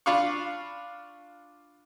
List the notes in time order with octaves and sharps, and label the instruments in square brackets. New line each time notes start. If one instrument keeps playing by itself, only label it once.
[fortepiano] D4 F4 F5 B5 C#6